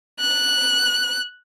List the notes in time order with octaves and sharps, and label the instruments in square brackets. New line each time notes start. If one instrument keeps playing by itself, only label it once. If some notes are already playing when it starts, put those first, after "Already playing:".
[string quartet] F#6